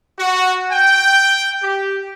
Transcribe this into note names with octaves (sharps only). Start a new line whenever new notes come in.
F#4
G5
G4